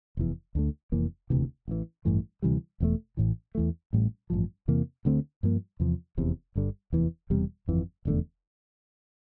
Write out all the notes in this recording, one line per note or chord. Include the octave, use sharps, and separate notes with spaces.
F1 E2 E3
D2 D3 A3
F1 F2 E3 A#3
E1 D2 C3 E3
A1 A2 E3
A1 G2 E3 A3
D2 C3 E3 G3
E1 E2 E3 A3
A1 A2 E3
E2 E3 A3
A1 A2 G3
A1 G2 F3
E2 C3 E3 A#3
D2 D3 A3 C4
G2 F3 A#3
E2 C3 F3
F1 E2 C3
G1 G2 D3
F1 E2 E3
E1 E2 C3 G3
G1 F2 E3
F1 E2 D3 A3